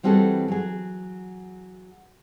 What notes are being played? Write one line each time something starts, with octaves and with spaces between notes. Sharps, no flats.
E3 G3 C4 F#4 G#4 A4
F#3 G#4